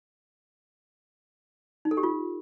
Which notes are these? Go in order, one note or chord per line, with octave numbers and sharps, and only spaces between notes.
D#4
A4
G4
F4